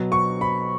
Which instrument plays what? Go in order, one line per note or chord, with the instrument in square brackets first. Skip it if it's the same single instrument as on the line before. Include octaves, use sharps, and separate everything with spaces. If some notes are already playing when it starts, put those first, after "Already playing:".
Already playing: [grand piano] B2 F#3
C#6
B5